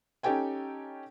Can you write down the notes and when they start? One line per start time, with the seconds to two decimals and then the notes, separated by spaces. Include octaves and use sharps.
0.23 C#4 D#4 G4 A4 G5 G#5